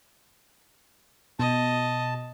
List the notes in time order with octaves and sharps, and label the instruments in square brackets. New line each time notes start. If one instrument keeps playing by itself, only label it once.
[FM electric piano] B2 [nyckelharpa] D#5 [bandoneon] A5